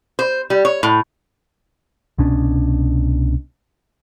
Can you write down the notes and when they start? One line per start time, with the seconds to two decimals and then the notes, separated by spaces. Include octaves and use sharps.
0.19 C5
0.50 G3
0.65 C#5
0.83 A2
2.18 C2 B2 C#4 D4